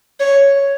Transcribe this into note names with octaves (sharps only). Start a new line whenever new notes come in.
C#5